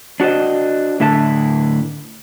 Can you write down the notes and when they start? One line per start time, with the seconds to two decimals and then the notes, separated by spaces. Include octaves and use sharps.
0.20 D4 F#4 G4 C5 D#5
1.00 A2 D3 E4 E5 A5